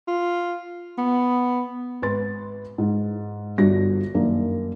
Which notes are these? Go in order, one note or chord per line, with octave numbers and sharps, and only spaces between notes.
F4
B3
G#1 B4 C6 A6
G#2
G1 G2 D4 F#4 A#6
F#2 D#3 A#3 D4